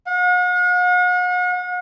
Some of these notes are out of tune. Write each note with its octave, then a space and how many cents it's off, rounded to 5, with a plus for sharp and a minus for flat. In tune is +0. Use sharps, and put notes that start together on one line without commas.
F#5 -45